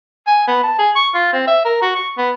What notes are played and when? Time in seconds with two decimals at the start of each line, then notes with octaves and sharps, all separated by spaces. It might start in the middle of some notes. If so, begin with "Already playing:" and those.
0.27 G#5
0.47 B3
0.63 A5
0.78 G#4
0.95 C#6
1.14 F4
1.33 C4
1.47 E5
1.65 A#4
1.82 F#4
1.95 C#6
2.17 B3